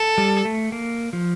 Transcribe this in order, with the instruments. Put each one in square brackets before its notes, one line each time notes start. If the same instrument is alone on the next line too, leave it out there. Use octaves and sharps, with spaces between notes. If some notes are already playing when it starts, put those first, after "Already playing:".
Already playing: [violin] A4
[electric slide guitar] G3
A3
A#3
F3